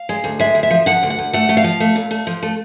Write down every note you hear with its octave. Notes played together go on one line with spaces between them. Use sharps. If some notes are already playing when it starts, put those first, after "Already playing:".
Already playing: F5
G#3
D2
G#3 E5
D2
E5
F3
F3 F#5
D2
F#5
D2
A3 F#5
A3
F5
F3
A3
A#2
A3
F3
A3